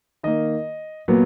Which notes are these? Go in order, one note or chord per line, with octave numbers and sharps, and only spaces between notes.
D#3 A#3 D#5
A#2 F#3 B3